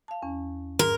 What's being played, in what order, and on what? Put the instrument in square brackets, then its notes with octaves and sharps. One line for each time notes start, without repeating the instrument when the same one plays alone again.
[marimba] F5 A5
E2 C#4
[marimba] G#2 G#4 [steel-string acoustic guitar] A#4